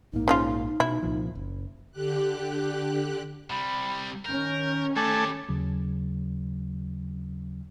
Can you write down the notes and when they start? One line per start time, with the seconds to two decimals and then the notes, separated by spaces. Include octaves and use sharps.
0.13 A#1 G#2 A#3 D#4
0.28 C#3 F3 F4
0.80 B2 E4
1.02 C2 A#2 F3
1.35 F#1
1.92 D3 G4 F#6
3.50 C3 G3 B5
4.26 D#3 C#4 A#4 G6
4.96 G3 A3 A4 G#5 A5 D6
5.49 D#2 C#3 F#3